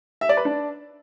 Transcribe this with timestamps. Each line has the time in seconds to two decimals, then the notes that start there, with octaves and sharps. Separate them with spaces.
0.21 E5
0.29 D5
0.37 B4
0.45 D4